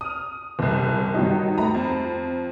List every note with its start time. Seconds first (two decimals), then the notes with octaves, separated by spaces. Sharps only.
0.01 D#6 F6
0.59 F#1 C2
1.14 G2 D#3 F#3 D#4
1.57 A3 A#5 B5
1.75 F2